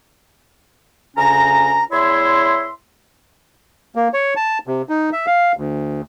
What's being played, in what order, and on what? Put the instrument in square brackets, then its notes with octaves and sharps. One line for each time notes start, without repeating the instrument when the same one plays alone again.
[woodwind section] D2 C#3 C#4 A#5
E2 E4 C#5 E5 C6
[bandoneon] A#3
C#5
A5
C3
D#4
E5
F5
D2